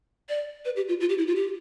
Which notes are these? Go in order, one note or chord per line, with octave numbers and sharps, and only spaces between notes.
D5
B4
G4
F4
F4
G4
E4
F4
G4